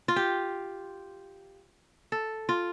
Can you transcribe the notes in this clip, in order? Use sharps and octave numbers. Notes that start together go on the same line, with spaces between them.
F4
G4
A4
F4